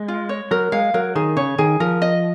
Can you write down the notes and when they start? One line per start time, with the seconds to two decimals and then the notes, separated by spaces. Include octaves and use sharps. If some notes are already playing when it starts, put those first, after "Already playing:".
Already playing: G#3
0.08 F4
0.29 C#5
0.51 F#3 A#4
0.72 G#3 F5
0.94 F#3 A#4
1.15 D#3 G#4
1.37 C#3 C#5
1.58 D#3 G#4
1.80 F3 A#4
2.02 D#5